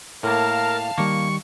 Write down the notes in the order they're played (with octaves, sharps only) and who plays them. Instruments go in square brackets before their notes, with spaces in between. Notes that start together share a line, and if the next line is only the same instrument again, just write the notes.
[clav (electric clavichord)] A2 A#3 [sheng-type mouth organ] A#4 [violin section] F5 A5
[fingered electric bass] D#3 G3 [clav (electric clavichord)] A#3 [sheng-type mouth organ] C#6